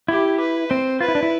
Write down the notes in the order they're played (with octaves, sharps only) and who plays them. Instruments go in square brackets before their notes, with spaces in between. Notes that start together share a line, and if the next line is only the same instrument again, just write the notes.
[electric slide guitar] E4 [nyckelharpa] G4
[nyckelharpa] B4
[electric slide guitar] C4 [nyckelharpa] C5
[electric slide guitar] F4 [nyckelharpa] B4
[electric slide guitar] E4
D4
E4